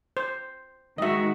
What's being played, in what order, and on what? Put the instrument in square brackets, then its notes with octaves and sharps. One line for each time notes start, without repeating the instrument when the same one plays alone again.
[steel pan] C5
[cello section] D#3 G#3 F#4 [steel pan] D#5 E5